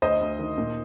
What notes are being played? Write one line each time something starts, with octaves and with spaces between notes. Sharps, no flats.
D2 C5 D#5
D2
D#3
A#2